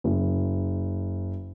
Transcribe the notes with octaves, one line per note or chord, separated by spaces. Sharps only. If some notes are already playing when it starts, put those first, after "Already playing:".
F#1